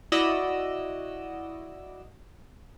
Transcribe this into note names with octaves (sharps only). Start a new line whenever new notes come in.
E4 F#4 D5 D#5 E6